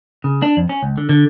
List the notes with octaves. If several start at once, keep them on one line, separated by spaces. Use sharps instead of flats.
C#3
D4
F2
C#4
C#2
D3
D3